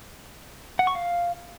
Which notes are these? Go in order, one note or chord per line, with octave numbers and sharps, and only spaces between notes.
F#5
C#6
F5